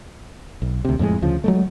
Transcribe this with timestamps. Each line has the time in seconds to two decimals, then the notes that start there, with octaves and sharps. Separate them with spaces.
0.62 B1
0.85 D2 C3
0.99 F2 A2 C3 G#3
1.22 D2 C#3 F3
1.44 F#3 G#3 A3